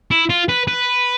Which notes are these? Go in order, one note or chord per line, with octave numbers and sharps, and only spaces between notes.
E4
F4
B4
B4